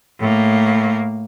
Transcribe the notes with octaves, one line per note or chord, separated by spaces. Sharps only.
A2 A#3